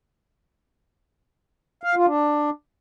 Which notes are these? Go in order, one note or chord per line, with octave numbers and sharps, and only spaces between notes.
F5
F4
D4